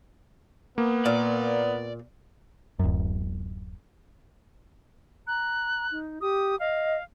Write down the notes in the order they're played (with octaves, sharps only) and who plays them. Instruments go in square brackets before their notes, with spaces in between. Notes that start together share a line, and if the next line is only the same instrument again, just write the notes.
[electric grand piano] A#3 [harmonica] B3
[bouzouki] A#2 [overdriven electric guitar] D5
[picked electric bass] D1 F#2
[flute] A#5 [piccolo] F#6
[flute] D#4
[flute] G4 [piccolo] D#6
[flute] D#5 [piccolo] F5